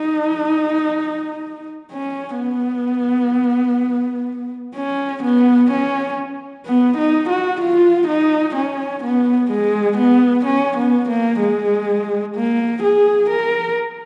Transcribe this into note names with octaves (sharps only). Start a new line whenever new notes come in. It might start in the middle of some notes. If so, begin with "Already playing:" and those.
Already playing: D#4
C#4
B3
C#4
B3
C#4
B3
D#4
F#4
F4
D#4
C#4
B3
G#3
B3
C#4
B3
A#3
G#3
A#3
G#4
A#4